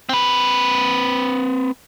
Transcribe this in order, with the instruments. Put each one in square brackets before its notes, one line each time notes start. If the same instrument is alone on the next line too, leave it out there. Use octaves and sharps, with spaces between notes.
[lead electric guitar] C4 B4